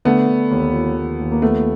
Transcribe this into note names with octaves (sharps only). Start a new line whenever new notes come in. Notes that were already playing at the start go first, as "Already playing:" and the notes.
D3 A3 B3
D3
D#2
F3
D#2
D#2
A#3
F3 A3 B3